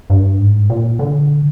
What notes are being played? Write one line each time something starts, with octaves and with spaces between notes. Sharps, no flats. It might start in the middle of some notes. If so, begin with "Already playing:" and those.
G2
G#2
A#2
D3